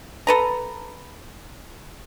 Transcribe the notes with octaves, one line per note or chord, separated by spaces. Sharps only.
A4 B4 A#5